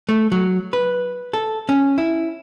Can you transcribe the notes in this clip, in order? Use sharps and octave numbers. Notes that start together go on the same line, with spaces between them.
A3
F#3
B4
A4
C#4
E4